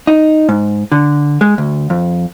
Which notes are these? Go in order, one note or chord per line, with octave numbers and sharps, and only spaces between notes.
D#4
G#2
D3
G#3
D2
F2